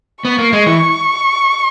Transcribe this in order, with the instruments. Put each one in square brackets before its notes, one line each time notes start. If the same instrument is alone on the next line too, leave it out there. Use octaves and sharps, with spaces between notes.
[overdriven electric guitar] B3 [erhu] C#6
[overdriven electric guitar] A#3
G#3
E3